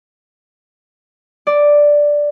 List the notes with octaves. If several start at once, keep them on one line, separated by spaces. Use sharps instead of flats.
D5